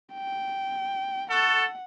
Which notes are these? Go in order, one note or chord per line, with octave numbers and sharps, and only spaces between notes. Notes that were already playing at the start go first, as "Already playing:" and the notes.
G5
F#4 A4 F#5